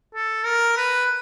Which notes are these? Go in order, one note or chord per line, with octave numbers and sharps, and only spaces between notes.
A4
A#4
B4